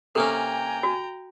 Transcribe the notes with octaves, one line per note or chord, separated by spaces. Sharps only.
C3 A#3 C#4 A4 G5 G#5 A#5
F#4